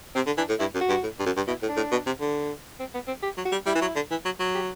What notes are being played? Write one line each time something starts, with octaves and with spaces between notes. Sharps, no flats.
C3 C4
D3
E3 D4
A2
G2 E4
F#2
F#4
G2
A2
G2
F#2
G2
B2 E4
A2
D4
A2
B2
C3
D3
C4
B3
C4
G4
F#3
F#4
G3
G3 E4
E3
F#3
D3
E3
F#3
F#3
G4